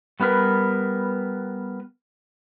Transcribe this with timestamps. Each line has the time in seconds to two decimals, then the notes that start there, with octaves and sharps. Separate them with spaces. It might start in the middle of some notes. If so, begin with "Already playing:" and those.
0.20 G3 B3 D#4 A#4 B4